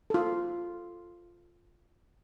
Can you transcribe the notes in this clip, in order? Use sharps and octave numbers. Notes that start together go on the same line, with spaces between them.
F4 A4